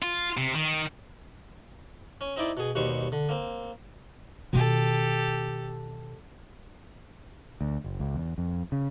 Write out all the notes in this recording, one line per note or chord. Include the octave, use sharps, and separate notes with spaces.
F4
C3
D#3
C#4
C4 D#4 E4 D5 D6
B2 G#4
D#2 B2 G3 C5 C#6
D3
A#3 C4
B2 D#3 G4 A4
D2
F#1
C#2
E2
F2
C#3